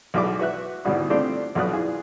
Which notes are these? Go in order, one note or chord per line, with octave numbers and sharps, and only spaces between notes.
B1 B2 G#4 D5 D6
F#4 B4 E5 F#6
G#1 D2 B2 E3 G3
G3 A3 C4 D4 F4 G4
B1 F2 B2 D5 D#6 F#6
E3 F4 G#4